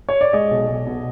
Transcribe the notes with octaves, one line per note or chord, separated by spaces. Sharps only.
C#5
D5
G#3 D#5
B1
B1
B2